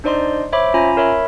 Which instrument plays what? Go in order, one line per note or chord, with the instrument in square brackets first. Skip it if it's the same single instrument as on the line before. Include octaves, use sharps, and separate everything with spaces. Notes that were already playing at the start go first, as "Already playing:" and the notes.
[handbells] D4 D#4 C5 D5 D#5 C6
C5 C#5 E5 B5 D6
C#4 F4 G#5 A#5 B5
A#4 C#5 E5 B5